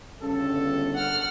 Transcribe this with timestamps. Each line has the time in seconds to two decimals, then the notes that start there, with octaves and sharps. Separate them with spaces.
0.22 G1 G2 C#3 A4
0.94 F#5 F6